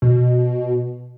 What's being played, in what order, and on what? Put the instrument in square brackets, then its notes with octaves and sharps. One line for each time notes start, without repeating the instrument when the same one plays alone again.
[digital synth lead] B2